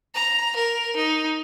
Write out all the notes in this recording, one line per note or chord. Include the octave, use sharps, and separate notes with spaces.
A#5
A#4
D#4